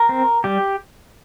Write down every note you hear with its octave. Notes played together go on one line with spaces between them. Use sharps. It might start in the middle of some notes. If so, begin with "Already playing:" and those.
Already playing: A#4
C4
G3 G4